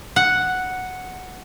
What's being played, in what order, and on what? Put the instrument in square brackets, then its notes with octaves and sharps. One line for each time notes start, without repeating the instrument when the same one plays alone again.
[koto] F#5